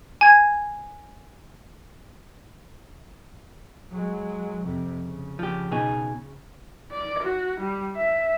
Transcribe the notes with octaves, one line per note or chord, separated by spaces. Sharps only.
G#5 G#6
F#3 G#3
F2 C3
C#3
F3 G4
B2 D#4 G#4
D5
F#4
G3
E5